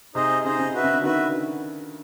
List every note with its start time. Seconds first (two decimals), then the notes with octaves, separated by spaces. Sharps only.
0.15 C3 D#4 G#4 C5 D#5
0.44 C#3 D#4 G#4 C5 D#5
0.59 C#3
0.74 F#4 B4 E5
0.84 C#3
0.94 D3
1.04 D#3 F#4 B4 E5